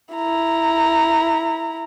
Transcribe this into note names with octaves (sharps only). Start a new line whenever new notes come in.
E4 A#5